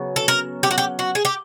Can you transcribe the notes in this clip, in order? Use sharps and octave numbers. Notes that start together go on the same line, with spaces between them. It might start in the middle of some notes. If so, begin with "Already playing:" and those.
Already playing: C#3 F#3 B3
A4
A#4
G4
F#4
G4
F#4
G#4
G4